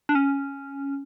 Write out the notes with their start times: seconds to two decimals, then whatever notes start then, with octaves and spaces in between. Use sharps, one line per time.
0.09 D4
0.15 C#4